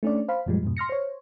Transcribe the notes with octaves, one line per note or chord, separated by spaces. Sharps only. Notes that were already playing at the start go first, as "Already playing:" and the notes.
A3 C#4 D4 D5
C5 F5 B5
F#2 A#2 F3 G3 G#3
F2 G#2 B2
C6 F6 A#6 C#7
C5 C#5